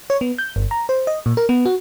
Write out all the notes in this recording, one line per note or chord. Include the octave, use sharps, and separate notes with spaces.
C#5
B3
G6
G1
A#5
C5
D#5
A#2
A#4
B3
F#4